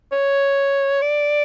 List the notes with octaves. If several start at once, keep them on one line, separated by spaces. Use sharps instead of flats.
C#5
D5